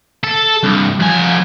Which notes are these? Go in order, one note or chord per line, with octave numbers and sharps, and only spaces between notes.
A4
C2 G2
F2 G#5